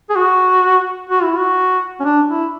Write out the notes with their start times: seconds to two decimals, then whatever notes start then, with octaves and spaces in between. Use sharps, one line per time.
0.09 G#4
0.16 F#4
1.09 F#4
1.23 E4
1.38 F#4
2.00 C#4
2.04 D4
2.29 E4